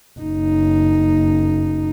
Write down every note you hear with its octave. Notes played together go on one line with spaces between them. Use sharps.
F#1 D#4